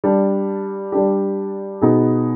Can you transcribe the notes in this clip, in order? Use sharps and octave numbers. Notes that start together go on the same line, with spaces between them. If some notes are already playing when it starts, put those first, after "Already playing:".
G3 D4 G4
G3 D4 G4
B2 B3 D#4 G#4